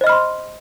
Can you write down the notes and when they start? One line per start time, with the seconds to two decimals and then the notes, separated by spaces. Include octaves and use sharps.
0.01 C5
0.04 D#5
0.07 F6
0.09 B5
0.12 C6